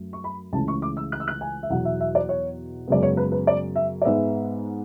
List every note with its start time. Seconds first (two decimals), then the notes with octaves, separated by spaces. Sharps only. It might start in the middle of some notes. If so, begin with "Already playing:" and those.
Already playing: F#2 A3
0.13 C#6
0.24 B5
0.52 C#2 C#3 E3 A3 A5
0.68 C#6
0.82 D6
0.97 E6
1.12 F#6
1.20 E6
1.28 F#6
1.41 G#5
1.63 E5
1.70 E2 B2 F#3 F#5
1.85 E5
2.00 E5
2.15 D5
2.29 C#5
2.88 F#2 C#3 G#3 B3 D5
3.03 C#5
3.17 B4
3.32 B4
3.47 D5
3.76 E5
4.02 D5
4.05 G#2 G#3 B3 E5